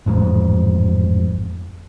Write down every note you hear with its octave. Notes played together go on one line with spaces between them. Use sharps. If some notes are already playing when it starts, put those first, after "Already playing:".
A1 F2 G#2